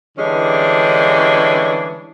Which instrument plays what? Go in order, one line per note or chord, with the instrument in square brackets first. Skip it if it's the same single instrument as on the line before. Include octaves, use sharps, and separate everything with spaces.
[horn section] D3 E3 G3 G#3 C#4 D4